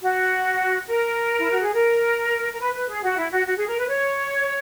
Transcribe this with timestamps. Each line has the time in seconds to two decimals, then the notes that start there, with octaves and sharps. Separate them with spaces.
0.01 F#4
0.87 A#4
1.38 E4
1.51 F#4
1.61 G#4
1.73 A#4
2.53 A#4
2.60 B4
2.74 B4
2.89 G#4
3.03 F#4
3.17 E4
3.32 F#4
3.46 F#4
3.57 G#4
3.67 A#4
3.79 B4
3.89 C#5